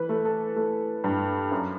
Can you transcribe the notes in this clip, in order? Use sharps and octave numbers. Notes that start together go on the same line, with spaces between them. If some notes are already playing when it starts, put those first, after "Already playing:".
Already playing: E3 B4
A3
A4
A3
G2
F#2